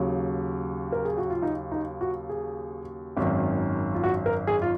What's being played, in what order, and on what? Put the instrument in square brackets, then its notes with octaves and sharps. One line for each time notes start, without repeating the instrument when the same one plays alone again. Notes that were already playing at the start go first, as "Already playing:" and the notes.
Already playing: [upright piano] D#2 C#3 F#3
A#4
G#4
F#4
F4
D#4
D#4
F#4
G#4
G#1 F#2 D#3
F4
F#4
A#4
G#4
F4